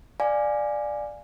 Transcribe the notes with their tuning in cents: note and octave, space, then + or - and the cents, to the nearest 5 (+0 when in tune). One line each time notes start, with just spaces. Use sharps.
D5 +10 F5 +0 G#5 +0